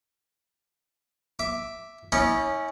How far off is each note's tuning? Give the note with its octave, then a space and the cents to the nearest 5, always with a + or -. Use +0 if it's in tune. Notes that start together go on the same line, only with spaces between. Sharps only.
E5 +0 D6 +0
C#4 +0 E4 -40 D#5 -45